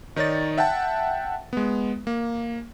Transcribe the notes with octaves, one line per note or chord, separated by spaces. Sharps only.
D#3 D#4 C#5 D5 A6
E5 F#5 G5 A5
G#3 B3
A#3